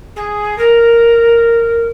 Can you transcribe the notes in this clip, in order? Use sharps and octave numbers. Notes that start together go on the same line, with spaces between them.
G#4
A#4